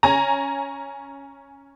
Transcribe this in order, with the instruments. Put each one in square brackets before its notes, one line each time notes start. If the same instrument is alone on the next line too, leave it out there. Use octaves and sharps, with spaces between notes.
[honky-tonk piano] C#4 G#5 A#5